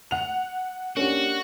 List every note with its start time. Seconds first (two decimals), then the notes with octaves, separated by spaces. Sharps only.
0.11 F#5 F7
0.97 A#3 C#4 D4 F#4 G4